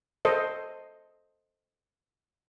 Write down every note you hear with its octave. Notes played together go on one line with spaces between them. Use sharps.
A4 C5 D#5